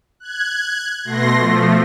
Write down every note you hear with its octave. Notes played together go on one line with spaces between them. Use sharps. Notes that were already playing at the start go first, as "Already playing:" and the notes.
F#6 G#6
B2 A3 C6 A#6
F3 A3